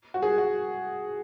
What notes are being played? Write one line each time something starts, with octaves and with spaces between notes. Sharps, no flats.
F#4
G#4
F#4